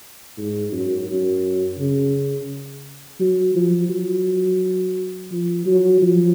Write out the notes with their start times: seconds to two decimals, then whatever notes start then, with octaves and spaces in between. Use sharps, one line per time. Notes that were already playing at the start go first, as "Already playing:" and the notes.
0.37 G#2
0.72 F#2
1.08 F#2
1.78 C#3
3.20 F#3
3.55 F3
3.89 F#3
5.32 F3
5.66 F#3
6.02 F3